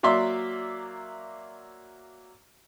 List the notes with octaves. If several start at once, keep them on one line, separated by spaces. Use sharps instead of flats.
F#3 A#3 D5 E5 C6